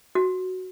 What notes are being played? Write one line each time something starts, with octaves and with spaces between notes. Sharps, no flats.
F#4